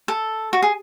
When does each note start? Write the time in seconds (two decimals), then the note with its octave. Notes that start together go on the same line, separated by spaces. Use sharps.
0.08 A4
0.53 F#4
0.62 G#4